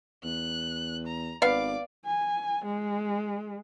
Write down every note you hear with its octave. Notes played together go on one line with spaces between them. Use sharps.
E2 F#6
A#5
G#1 B3 D5 F5 D6
G#5
G#3